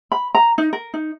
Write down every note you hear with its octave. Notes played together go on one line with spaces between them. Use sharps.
B5
A#5
D#4
A#4
D#4